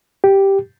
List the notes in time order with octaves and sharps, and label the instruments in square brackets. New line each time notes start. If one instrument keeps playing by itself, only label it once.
[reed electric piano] G4